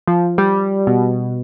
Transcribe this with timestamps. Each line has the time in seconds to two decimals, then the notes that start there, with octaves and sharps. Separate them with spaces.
0.08 F3
0.38 G3
0.87 B2